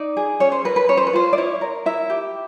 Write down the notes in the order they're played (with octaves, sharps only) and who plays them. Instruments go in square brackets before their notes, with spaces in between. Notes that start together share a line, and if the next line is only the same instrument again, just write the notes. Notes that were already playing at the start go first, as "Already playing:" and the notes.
Already playing: [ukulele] D#4 D5
G#4
C#4 C#5
C5
A#4 B4
B4
C#4 C#5
C5
B4
F4 C5
D5
E4 C#5
A#4
E4 E5
G4